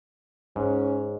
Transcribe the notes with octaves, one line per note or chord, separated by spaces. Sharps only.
G#2 C#4